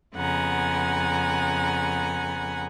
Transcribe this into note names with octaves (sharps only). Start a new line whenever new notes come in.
F2 C#3 B3 F#5 G#5 A#5